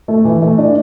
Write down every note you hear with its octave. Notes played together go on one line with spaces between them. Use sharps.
A3
E3
A3
D4